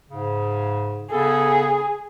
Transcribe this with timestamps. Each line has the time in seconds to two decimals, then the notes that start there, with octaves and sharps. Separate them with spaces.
0.10 G#2 C#3
1.12 C#3 B3 G#4 A4